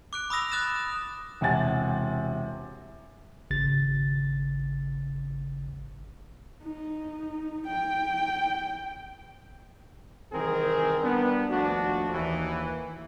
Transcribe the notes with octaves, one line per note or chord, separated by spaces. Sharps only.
D6 F#6 D7
B5 D#6 E6 A#6 F7
D#6 F#6 A6 E7
E1 C3 F#5 G#5 A6
G#1 C#3 A6
D#4
G5
C2 D#3 E3 C4 G#4 A#4
G3 B3 D4
D#2 F3 A3 D4 F#4
D#2 E3